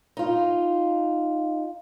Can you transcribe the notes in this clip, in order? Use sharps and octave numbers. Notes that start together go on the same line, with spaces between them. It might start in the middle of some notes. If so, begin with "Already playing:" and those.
D#4 F4